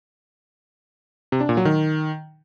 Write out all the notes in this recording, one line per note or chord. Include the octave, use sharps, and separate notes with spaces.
C3
D4
A#2
F#3
D#3